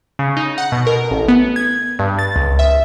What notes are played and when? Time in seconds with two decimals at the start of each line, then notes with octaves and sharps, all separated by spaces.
0.19 C#3
0.37 D#4
0.58 F#5
0.72 B2
0.87 A#4
1.11 A1
1.28 B3
1.56 G#6
1.99 G2
2.19 A6
2.36 C#2
2.59 E5